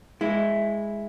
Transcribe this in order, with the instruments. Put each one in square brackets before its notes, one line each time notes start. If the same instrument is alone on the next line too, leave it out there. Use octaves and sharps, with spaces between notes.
[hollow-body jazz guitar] G#3 E4